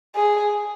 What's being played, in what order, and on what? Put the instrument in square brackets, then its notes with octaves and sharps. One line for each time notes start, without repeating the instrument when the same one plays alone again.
[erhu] G#4